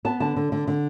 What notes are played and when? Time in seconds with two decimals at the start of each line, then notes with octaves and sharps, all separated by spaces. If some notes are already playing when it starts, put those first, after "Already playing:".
0.05 B3 A5
0.20 D3 A5
0.36 D3
0.52 D3
0.67 D3